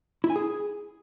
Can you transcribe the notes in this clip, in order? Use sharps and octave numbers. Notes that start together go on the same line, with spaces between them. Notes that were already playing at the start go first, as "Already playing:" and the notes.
E4
G#5
G#4